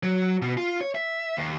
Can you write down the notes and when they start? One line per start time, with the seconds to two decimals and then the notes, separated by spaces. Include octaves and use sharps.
0.03 F#3
0.42 B2
0.57 F4
0.81 C#5
0.95 E5
1.37 D#2